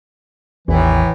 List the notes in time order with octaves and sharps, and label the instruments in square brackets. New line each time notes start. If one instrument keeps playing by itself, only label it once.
[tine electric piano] A1 E2 [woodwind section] A2 D#3 E3